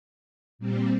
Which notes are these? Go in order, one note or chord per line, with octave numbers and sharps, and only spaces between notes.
A#2 G3 C4